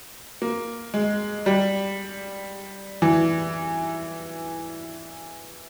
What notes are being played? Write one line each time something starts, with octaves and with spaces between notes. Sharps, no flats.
A#3
G#3
G3
E3